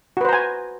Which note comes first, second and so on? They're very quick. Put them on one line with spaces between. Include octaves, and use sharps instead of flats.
F#4 B4 C5 A#5 G#5